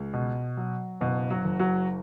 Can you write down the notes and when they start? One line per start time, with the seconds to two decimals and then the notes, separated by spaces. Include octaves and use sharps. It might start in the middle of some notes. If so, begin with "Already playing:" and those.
Already playing: C#2
0.13 B2
0.57 F#3
1.01 F#1 B2 B3
1.30 F#3 F#4
1.44 F#1
1.59 F#3 F#4